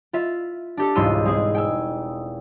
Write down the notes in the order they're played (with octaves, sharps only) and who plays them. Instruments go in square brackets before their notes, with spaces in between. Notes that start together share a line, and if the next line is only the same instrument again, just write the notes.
[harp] F4 E5
D4 G4 A4
E1 C#2 G#2 C6 E6 D#7
G#3 C4 G#4
G5 G#5 E6